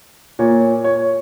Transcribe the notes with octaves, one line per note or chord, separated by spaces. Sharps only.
A#2 C#5
C#5